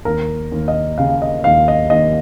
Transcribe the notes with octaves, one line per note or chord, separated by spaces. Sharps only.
D#2 A#4
D#2
D#5
C#3 F5
D#5
D#2 F5
D#5
D#2 D#5